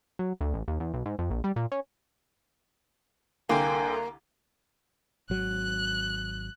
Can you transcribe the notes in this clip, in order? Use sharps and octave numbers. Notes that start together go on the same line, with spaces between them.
F#3
D2
A1
D#2
E2
B1
G#2
F2
A#1
G3
A#2
C#4
C2 D3 A#3 G5 G#5
G#1 F#3 F#6